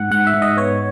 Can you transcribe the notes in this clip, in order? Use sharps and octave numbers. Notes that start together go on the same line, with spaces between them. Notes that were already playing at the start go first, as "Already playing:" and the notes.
Already playing: G#2 F#5
G#2 F#5
E5
G#2
D#5
B3 C#5